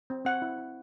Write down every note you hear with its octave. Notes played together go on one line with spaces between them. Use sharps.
C4
C4 F#5
E4
E4